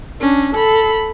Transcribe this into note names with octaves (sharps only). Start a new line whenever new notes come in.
C#4 D4
A4 B5